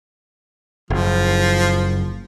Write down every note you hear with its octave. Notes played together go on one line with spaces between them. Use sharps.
F#1 F3